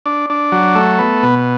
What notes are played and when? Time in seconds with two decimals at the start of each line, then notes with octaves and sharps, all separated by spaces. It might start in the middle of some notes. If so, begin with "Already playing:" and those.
0.06 D4
0.30 D4
0.52 F#3
0.75 A3
0.99 B3
1.23 B2